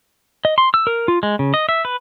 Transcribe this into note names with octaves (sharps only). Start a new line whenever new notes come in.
D#5
C6
E6
A#4
F4
G#3
C#3
D#5
E5
B4